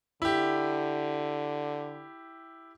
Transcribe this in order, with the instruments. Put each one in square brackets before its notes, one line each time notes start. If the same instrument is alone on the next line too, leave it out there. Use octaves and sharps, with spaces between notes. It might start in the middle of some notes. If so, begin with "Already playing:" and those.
[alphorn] D3 [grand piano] E4 G4